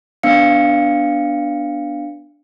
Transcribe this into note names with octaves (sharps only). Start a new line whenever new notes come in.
B3 D4 F5 C#7